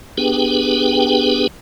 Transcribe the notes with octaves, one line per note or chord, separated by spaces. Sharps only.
B3 D4 G4 G#4 B4 G5